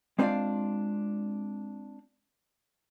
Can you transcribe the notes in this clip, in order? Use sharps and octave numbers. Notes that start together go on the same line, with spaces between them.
G#3 C4 D4 F4 D5 F5